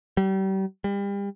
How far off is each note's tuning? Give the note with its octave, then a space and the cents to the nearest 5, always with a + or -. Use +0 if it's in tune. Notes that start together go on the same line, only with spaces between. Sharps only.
G3 -35
G3 +35